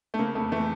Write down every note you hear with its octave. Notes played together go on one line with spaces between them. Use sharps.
A3
C#3 A#3
F2 A3
E3 A3